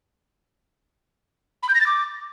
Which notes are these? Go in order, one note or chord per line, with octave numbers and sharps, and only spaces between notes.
B5
G6
A#6
A6
D6